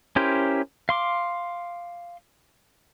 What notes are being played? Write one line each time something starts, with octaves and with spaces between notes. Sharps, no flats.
C#4 E4 G4 A#4 C5
F5 C6 D6